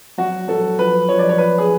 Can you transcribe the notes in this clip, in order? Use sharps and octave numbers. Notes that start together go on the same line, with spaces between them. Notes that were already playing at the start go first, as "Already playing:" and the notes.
F#3 F#4
F#3 A4
F3 B4
F3 C#5
D5
C#5
F3 B4
G#4